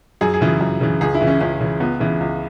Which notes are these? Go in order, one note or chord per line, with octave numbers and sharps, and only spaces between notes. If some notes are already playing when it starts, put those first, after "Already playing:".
F#2 G#4
G#4
C#3 E3
G#4
F#2
C#3 E3
C#2 G#4
E4
C#3 E3
C#4
C#2 C#4
C#3 E3
C#2 B3
C#3 E3
C#2